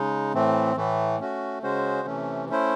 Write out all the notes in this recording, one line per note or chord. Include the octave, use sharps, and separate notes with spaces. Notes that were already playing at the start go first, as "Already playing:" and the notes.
Already playing: C#3 G#3 D#4
A2 E3 A3 C4
A2 E3 A3
A3 C#4 F#4
C#3 G#3 C#4 F#4 C5
C3 E3 A3 C#4
A3 C#4 E4 C5